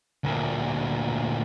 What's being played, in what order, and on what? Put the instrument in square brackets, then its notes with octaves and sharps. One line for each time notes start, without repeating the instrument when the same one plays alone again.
[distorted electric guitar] D2 A#2